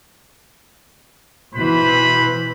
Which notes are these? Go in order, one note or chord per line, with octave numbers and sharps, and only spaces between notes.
B2 E3 B4 C5 B5